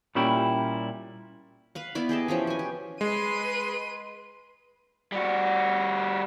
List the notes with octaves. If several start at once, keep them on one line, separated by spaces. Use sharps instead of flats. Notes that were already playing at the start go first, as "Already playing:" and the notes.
A#2 G3 C#4 E4 G4 G5
B4 F5 F#5
B3 E4 D5 B5
G4 G#4 D#5 A5
E3 F3 C#4 G5
F#4 G#5
G4
G#3 B4 C6 D#7
G3 F#4